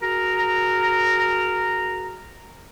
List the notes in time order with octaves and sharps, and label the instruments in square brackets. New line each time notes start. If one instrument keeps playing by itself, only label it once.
[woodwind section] F#4 G#4 A#4 A#5